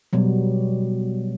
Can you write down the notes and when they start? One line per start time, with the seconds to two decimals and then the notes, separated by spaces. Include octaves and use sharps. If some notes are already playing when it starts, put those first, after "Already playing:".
0.13 B2 F#3 G3